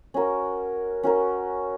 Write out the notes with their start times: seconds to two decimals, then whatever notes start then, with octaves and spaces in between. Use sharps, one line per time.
0.14 C#4 F#4 A#4
1.03 C#4 F#4 A#4